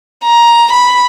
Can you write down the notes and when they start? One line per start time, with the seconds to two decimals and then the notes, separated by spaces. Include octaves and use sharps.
0.24 A#5
0.72 B5